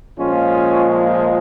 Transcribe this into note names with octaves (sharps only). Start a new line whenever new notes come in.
A#2 F3 G#3 C#4 F4